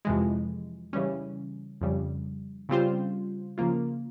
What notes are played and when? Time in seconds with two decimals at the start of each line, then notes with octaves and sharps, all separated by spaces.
0.05 F2 C3 E3 G#3
0.93 C#3 E3 G3 C#4
1.81 F2 C#3 G3
2.69 C#3 G3 C4 F4 C5
3.58 C#3 F3 A#3 F4